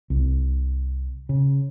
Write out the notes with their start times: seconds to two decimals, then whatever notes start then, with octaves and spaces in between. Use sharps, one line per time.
0.10 C2
1.29 C#3